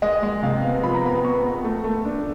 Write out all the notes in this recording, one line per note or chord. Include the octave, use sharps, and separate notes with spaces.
G#3 D#5
G#3
C3 F5
B3
F3 B5
A#5
B3 B5
B3 C#6
B3
A3
A3
D4